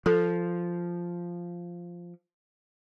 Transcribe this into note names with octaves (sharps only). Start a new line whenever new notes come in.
F3 A4